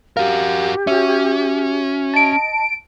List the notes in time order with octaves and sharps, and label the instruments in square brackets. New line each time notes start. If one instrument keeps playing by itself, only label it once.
[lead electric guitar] F#4 A#4 [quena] G4 [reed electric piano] F5
[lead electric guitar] C#4 [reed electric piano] F#4 E5
[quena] D#5 [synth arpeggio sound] A5 D7